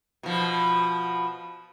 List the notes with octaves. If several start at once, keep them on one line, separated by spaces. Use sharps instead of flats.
B2 F3